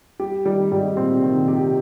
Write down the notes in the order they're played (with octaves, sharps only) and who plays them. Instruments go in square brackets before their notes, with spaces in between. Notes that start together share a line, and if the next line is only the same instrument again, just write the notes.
[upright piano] G3 [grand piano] G4
[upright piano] D#3 [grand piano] G3
[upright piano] G#2 [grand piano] G3
[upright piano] A#2 [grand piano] C4
[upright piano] C3
[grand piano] D#3
[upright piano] A#2
[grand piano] G4
[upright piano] C3